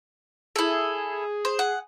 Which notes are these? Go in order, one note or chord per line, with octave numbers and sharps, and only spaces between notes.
E4 G#4 A4
C5
F#5